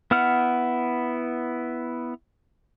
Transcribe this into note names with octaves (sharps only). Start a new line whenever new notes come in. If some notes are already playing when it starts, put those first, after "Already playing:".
B3 E4 F#5 F6